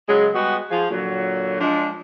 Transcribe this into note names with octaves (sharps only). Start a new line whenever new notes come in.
C#3 F#3 G#3
G3 G#3 B3 F#4
F3 G#4
A#2 D3 F#3
F3 G#3 D4